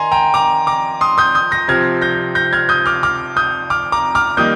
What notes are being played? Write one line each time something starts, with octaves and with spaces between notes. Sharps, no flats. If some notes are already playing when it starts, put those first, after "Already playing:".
Already playing: D#3 G#5 A#5 C6
G5 A#5
A#5 D6
A#5 D6
C6 D#6
D#6 G6
D#6 G6
G6 A#6
C3 F3 C4 F6 G#6
G6 A#6
G6 A#6
F6 G#6
D#6 G6
D6 F6
D6 F6
D#6 G6
D6 F6
A#5 D6
D6 F6
D#3 G3 A#3 D#6 G6